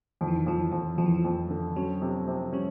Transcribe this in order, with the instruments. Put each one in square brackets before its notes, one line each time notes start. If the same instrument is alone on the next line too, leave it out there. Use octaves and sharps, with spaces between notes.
[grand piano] F2 [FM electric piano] D#3
[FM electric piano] E3
D#3
[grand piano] F2 [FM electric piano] F3
[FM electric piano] E3
[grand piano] F2
[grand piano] F2 [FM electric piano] F3
[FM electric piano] E3
F3
[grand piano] F2
D3
[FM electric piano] F#3 [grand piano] C#4
[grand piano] C3
C3
[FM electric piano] G3 [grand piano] C#4